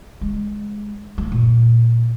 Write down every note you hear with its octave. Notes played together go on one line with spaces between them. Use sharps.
G#3
G#3 A3
A#2